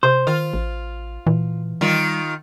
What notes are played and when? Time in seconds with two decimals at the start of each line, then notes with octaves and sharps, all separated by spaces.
0.03 C3 C5
0.27 D#3 F4
0.54 A1
1.27 A#2 E3
1.81 D#3 G3 F4